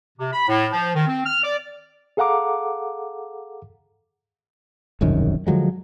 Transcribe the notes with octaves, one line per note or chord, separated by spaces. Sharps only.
C3
B5
A2
F3
D#3
C4
F6
D5
G#4 A4 F5 F#5 A#5 D6
E1 C2 F#2 D#3
D3 F3 F#3 G#3